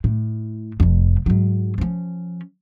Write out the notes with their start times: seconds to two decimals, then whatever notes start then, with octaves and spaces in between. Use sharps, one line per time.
0.04 A2
0.80 F1 F2
1.26 G#2 F#3
1.78 F3 C#4